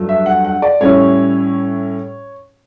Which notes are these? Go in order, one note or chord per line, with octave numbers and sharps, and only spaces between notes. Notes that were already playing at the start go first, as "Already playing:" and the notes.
Already playing: G2 F#3 A3
E5
F#5
F#5
D5
A2 G3 C#4 E4 C#5